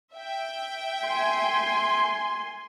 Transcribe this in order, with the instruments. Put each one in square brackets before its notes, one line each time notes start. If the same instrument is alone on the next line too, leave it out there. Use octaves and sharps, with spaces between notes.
[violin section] E5 G5
[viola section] G#5 C6